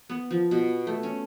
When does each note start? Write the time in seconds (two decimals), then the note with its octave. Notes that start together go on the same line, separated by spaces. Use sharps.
0.10 B3
0.31 F3
0.51 B2
0.87 A3
1.03 C#4